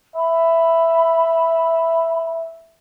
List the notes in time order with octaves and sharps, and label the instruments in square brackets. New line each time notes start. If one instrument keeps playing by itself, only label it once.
[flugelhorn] E5 [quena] B5